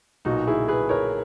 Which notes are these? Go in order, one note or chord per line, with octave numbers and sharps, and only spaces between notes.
B1 A#2 D#4 F#4
E4 G#4
G#4 B4
A#4 C#5